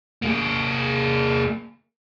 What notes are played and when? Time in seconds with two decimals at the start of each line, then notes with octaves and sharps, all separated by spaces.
0.22 A#3 G#4